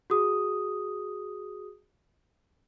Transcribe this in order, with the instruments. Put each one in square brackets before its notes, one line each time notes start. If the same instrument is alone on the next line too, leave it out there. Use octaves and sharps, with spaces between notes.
[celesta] F#4 G#4 D#6